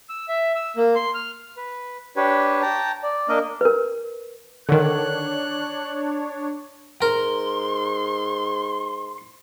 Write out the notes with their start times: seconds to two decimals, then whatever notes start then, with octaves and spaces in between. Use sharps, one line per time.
0.09 E6
0.29 E5
0.56 E6
0.77 A#3
0.96 C6
1.14 F6
1.57 B4
2.16 D4 G4 B4 C#5
2.62 G5 A5 A#5
3.03 D5
3.29 A#3 D4 A#4 D#5
3.61 A#4 B4
4.69 D3 D#3 D4 C#5 F#6
7.02 G#2 A#4 C6